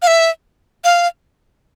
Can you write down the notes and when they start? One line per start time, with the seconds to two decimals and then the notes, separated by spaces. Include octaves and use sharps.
0.02 F5
0.07 E5
0.84 F5